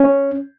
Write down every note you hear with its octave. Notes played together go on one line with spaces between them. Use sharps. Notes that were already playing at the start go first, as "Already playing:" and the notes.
Already playing: C#4